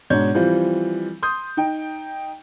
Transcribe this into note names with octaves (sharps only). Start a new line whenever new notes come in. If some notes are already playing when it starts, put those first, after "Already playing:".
G#2 B2 D4 C#5 G6
E3 F3 G3 C4 F4
C6 D#6 G6
D#4 G5